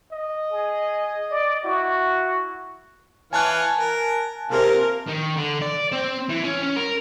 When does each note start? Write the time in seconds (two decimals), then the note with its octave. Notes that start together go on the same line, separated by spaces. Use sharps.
0.12 D#5
0.52 G#4
1.31 D5
1.64 E4 F#4
3.33 E3 C#5 F5 G#5 A5 F#6
3.78 A#4
4.51 C3 A#3 F4 A#4
5.08 D#3
5.37 D3
5.62 D5
5.92 C4
6.29 E3
6.44 C#4
6.63 C#4
6.76 A#4